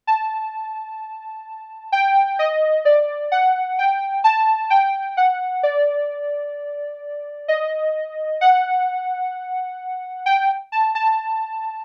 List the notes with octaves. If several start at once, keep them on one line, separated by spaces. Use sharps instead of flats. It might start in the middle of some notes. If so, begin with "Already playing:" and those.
A5
G5
D#5
D5
F#5
G5
A5
G5
F#5
D5
D#5
F#5
G5
A5
A5